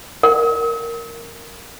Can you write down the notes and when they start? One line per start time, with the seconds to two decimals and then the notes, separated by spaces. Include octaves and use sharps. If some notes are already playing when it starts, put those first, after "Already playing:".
0.23 A#4